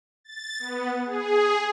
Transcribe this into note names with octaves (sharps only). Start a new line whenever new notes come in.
A6
B3
G#4